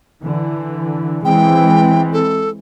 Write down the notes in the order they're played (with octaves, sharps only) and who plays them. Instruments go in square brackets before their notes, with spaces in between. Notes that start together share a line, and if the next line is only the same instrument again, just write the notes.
[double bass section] D3 E3
[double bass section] E3 G#3 C4 [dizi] G5
[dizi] A4